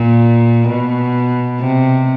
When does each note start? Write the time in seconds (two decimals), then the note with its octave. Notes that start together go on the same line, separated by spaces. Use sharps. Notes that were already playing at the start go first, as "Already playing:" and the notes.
Already playing: A#2
0.68 B2
1.60 C3